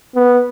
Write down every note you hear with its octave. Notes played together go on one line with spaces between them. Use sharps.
B3